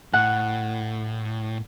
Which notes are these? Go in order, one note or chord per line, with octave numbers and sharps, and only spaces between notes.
A2 F#5